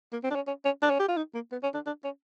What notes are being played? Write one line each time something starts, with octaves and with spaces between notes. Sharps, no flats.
A#3
C4
D4
C#4
C#4
C#4
D4
C#4
G4
F4
D#4
A#3
B3
C#4
D4
D4
C#4